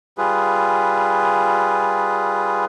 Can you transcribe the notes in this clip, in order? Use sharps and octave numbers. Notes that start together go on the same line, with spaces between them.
G3 F4 G#4 B4